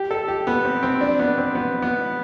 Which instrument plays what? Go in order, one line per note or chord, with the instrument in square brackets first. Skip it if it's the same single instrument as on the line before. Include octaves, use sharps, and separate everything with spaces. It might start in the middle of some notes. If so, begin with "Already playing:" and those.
Already playing: [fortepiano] G4
A4
G4
B3
C4
C4
D4
B3
C4
B3
B3